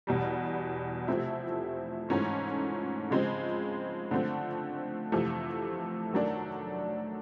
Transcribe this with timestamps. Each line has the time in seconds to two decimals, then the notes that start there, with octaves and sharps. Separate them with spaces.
0.07 E2 B2 G3
1.08 C3 F3 A3 C4 E4
2.09 G#2 E3 A3 C#4 F4
3.10 C#3 F3 G#3 C4
4.11 D3 F3 A3 C4
5.12 F2 C3 E3 A3
6.13 D#3 F#3 A3 D4